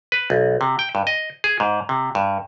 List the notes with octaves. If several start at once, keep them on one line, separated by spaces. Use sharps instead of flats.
B4
B1
C3
G5
G2
D#5
G#4
G#2
C3
G2